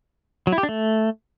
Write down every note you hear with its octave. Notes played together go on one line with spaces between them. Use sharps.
F#3
E4
G4
D4
A3